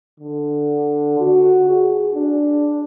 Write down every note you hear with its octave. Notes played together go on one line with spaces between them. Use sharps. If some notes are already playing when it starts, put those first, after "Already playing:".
D3
F#4
G#4
D4